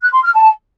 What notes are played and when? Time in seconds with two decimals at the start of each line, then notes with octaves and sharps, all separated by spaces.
0.01 F#6
0.12 C6
0.23 F6
0.34 A5